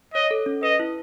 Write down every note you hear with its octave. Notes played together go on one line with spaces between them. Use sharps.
C#5 D#5
A4
C#4
B4 D#5
E4